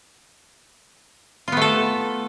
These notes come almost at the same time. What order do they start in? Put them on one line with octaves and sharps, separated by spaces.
F4 B3 A3 A4